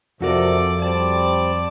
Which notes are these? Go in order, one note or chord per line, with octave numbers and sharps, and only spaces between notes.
F2 C3 F3 F#4 A4 A#4 D5
G3 C4 D5 A5